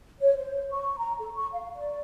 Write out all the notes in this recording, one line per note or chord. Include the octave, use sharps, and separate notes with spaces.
C#5
C5
C#6
A#5
A4
C#6
F5
D5